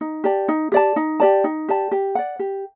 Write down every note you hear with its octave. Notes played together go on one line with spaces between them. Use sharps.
D#4
G4 D5 A5
D#4
G4 D5 A5
D#4
G4 D5 A5
D#4
G4 D5 A5
G4
D5 F#5
G4